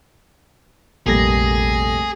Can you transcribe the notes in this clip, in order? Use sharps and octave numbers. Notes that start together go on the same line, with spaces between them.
F1 A#1 G3 A#3 G#4 A4 A#6